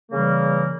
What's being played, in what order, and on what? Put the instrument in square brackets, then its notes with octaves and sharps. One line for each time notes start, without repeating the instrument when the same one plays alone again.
[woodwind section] C#3 E3 G3 A#3